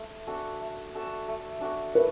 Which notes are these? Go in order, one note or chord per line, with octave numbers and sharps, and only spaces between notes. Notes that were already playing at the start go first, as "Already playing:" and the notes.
Already playing: A3
D4 F#4 A4
A3
D4 F#4 A4
A3
D4 F#4 A4
A3 B4